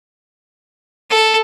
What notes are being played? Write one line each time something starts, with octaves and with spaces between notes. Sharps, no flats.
A4